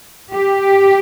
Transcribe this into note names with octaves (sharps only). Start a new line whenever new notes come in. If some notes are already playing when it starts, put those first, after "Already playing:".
G4